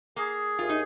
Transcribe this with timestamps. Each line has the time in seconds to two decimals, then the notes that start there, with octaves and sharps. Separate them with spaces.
0.16 A#3 G#4
0.59 D#2 F4
0.69 D#4